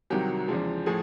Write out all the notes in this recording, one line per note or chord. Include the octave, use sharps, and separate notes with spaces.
C2 C3 D#3 F#3 G4
E2 C#3 F3 G#3
A2 F3 G#4